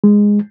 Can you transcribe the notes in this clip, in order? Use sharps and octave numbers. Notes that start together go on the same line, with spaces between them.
G#3